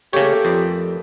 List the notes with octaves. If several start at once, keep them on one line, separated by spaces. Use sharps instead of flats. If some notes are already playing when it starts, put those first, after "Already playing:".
C#3 A3 A#3 G4 C#5
F2 B4 D5